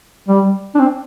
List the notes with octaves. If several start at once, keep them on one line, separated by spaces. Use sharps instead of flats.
G3
D4
C4